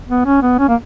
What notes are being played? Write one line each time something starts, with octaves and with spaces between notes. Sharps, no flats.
B3
C#4
B3
C#4
A#3